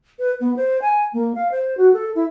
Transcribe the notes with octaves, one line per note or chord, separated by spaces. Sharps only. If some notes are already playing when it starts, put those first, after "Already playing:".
B4
B3
C5
G#5
A#3
F5
C5
F#4
A4
E4